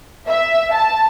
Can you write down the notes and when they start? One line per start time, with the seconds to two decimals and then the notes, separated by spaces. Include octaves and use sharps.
0.28 E5
0.72 A5